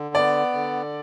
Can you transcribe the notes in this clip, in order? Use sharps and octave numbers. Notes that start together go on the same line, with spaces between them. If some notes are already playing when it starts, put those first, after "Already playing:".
Already playing: D3
B3 D5
D3